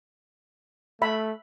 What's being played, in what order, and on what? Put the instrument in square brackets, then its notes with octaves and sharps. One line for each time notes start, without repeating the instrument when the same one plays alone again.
[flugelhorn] A3 [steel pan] E5 B5